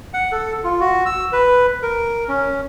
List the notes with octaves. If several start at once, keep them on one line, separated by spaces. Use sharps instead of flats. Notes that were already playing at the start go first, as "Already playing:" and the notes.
F#5
A4
F4
F#4
E6
B4
A#4
C#4